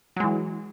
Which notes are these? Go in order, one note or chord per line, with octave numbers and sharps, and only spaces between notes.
E3 F#3 G#3